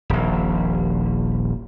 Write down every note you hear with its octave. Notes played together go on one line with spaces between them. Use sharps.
D#1 A#1